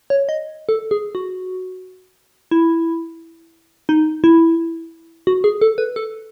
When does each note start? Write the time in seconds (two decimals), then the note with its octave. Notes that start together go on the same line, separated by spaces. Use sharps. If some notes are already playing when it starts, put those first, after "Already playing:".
0.10 C#5
0.29 D#5
0.69 A4
0.91 G#4
1.15 F#4
2.51 E4
3.89 D#4
4.24 E4
5.27 F#4
5.44 G#4
5.61 A4
5.78 B4
5.96 A4